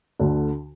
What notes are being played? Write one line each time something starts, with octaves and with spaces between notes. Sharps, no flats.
D2 D3